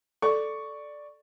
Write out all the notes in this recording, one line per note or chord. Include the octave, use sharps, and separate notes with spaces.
A4 D5 C#6